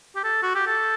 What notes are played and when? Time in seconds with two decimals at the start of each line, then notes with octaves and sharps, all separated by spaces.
0.16 G4
0.24 A4
0.43 F#4
0.55 G4
0.67 A4